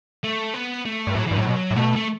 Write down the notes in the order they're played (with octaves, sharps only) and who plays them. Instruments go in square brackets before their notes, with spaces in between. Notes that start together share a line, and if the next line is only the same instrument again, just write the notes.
[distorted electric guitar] A3
B3
A3
[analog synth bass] G2
[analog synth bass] A2 [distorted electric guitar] F#3
[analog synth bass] G2 [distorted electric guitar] E3
[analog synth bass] A2 [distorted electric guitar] F#3
[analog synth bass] B2
A2
[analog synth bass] B2 [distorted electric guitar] A3
[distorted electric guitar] A3